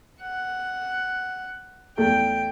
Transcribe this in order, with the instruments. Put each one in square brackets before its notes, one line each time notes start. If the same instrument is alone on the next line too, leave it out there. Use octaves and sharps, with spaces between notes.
[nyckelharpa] F#5
[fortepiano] E2 A3 [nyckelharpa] G5